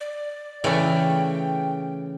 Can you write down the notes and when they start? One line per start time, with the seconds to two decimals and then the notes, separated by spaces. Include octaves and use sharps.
0.01 D5
0.64 C#3 E3 A3 C#5 D5 G5